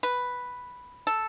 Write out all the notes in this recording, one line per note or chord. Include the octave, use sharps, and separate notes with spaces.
B4
A4